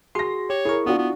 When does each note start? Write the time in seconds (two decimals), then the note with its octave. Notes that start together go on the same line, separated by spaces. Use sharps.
0.15 F#4 G#4 C6 A#6 C7
0.50 G4 C#5
0.65 E4 G#4 A#4 C#6
0.86 B3 D4 F4 F#4
0.98 B3